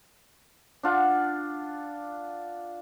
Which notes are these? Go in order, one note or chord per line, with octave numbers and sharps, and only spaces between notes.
D4 F4 F#5